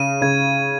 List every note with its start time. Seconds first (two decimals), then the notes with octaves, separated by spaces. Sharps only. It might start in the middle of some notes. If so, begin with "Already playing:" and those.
Already playing: C#3 D#7
0.22 C#3 G#6